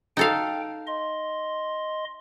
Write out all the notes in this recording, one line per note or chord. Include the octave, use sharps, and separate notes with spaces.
D#4 A4 F5 G5
D#5 C6